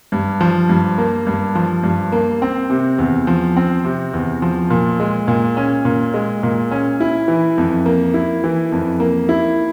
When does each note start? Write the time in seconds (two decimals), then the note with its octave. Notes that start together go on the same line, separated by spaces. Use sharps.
0.12 G2
0.41 F3
0.69 G2
0.98 A#3
1.27 G2
1.55 F3
1.83 G2
2.12 A#3
2.42 C4
2.70 C3
2.98 E2
3.27 F3
3.57 C4
3.84 C3
4.14 E2
4.42 F3
4.70 A#2
5.00 G#3
5.28 A#2
5.57 C#4
5.85 A#2
6.14 G#3
6.43 A#2
6.71 C#4
7.00 E4
7.28 E3
7.58 F2
7.86 A#3
8.14 E4
8.44 E3
8.72 F2
9.00 A#3
9.29 E4